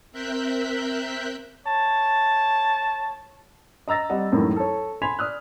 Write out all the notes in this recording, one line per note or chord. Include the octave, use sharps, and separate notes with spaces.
C4 A#4 E5 F#6 G6 B6
C#5 A5
D#5 A#5 E6 A6 A#6
G3 C4 D#5 F#5
F#2 A2 D#3 E3 G#3
A4 C#5
G#5 B5 C6 G#6 B6 F7
D5 D#6 F6 F#6